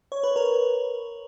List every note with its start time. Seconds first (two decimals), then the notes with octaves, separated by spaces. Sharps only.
0.12 C#5
0.23 B4
0.36 A#4 C#5